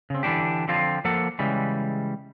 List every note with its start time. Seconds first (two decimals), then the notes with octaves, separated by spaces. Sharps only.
0.10 C#3 C4
0.23 D3 E3 C#4 D4 G4
0.68 D3 F3 C4 F4
1.05 F3 A#3 A4 F#5
1.39 C#3 E3 G3 G#3